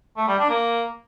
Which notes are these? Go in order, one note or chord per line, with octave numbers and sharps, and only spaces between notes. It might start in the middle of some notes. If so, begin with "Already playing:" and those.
A3
G3
D4
A#3